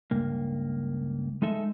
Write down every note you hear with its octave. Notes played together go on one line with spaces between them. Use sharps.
C#2 G2 A#3
G#3 D#4 A4 E5